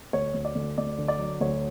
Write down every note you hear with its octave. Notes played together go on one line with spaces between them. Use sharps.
D2 C#5
D2
D5
D2
D2 D5
D3
D5
F#3
D2 C#5